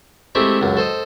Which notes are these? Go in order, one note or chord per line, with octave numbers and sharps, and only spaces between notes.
G#3 A3 C4 E4 G4
C#2 F#2
A4 C5 D#5